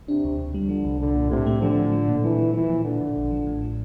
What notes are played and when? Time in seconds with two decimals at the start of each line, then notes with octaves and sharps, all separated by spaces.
0.08 C3 D4
0.24 D2
0.39 D2
0.54 G3
0.69 D3 F3
0.85 C2
1.00 C2 D3
1.15 A#2
1.31 A2 C3
1.46 A3
1.62 D3 F3
1.77 A2
1.92 F3
2.08 A#2
2.24 E3 F3
2.38 F3
2.53 E3 F3
2.69 A#2
2.84 A#2 D3
3.01 A#2
3.16 A1
3.31 F3
3.47 A2
3.61 F3